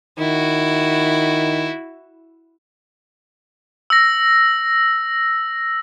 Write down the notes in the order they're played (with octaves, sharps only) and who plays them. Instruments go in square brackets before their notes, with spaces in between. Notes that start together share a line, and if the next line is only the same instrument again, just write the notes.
[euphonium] D#3 [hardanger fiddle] E4 F#4
[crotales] E6 A#6